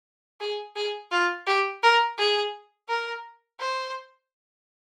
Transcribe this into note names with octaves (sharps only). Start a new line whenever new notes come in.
G#4
G#4
F4
G4
A#4
G#4
A#4
C5